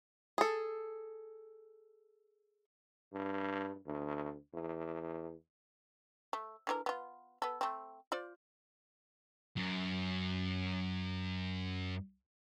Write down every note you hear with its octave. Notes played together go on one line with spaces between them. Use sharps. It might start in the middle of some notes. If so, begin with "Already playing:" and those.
G#4 A4
G2
D2
E2
A3
D3 E3 A#4
B3 F4
B3 A4
A3 C4
F4 C5 D5
F#2 F#3